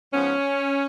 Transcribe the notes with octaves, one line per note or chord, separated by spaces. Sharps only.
G#2 F3 B3 C#4